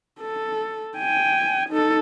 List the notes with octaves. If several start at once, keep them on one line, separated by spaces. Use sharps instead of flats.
A4
G5 G#5
D#4 A4